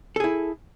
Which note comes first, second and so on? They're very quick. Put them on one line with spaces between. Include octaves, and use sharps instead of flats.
A4 G#4 E4